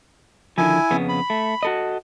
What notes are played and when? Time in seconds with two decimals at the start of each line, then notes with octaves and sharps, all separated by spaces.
0.58 D3 D#3 F3 E4 G#5
0.91 F2 C#3 B3
1.09 B5
1.30 A3
1.63 F#4 A4 D#5